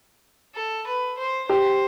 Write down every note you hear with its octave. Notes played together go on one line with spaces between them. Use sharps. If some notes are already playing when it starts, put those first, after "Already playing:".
A4
B4
C5
G4 C5